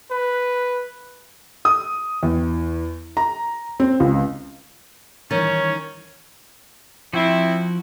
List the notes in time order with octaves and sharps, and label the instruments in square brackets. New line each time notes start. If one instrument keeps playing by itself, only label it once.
[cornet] B4
[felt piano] D#6
E2
A#5
C4
C#2
[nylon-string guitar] D#3 [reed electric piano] E3 G3 A6 [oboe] C#4 [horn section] C#5
[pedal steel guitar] F3 F#4 [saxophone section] C4 E4